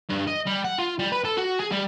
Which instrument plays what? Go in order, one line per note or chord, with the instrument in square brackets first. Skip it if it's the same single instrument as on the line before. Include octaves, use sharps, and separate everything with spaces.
[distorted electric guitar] G2
D#5
G3
F#5
F4
G3
B4
A4
F#4
G#4
G3